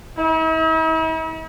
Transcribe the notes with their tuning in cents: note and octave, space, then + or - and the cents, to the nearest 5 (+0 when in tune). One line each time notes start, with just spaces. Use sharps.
E4 -45